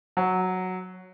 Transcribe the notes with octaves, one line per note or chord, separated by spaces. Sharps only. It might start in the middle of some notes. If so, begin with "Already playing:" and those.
F#3